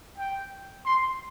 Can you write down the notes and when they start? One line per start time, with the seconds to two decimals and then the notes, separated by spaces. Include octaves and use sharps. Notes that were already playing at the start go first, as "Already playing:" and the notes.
0.18 G5
0.85 C6